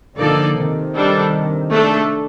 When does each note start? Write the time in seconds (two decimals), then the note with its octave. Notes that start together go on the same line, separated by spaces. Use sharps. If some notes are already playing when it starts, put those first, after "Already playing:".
0.18 D3 F3 A#3 D#4 A4 D5
0.57 C3 D#3
0.95 G3 D4 A4
1.71 A3 D4 A4